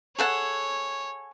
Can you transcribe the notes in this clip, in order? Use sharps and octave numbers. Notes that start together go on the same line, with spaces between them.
G#4 A4 C#5 F#5